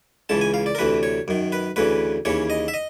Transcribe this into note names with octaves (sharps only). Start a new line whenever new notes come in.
C#2 C#3 E3 A5
G#5
F5
D5
A#4
D2 C3 E3 B4
C#5
F#2 D#3
B4
D2 C#3 E3 B4
D#2 C#3 E3 C#5
D#5
E5
D#5